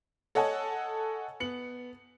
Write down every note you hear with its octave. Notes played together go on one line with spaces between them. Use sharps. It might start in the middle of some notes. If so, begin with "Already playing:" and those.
A4 C#5 D#5 F#5 G#5 A5
B3 C#7 F#7